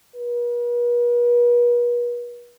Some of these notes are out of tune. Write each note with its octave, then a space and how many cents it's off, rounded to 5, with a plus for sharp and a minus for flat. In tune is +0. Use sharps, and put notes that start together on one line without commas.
B4 -45